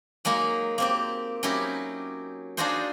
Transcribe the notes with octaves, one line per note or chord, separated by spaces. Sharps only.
F#3 G#3 A#3 D#4
A#3 C4 G4
F#3 C#4 D#4 E4 G4
D4 D#4 F4 F#4 G#4 C5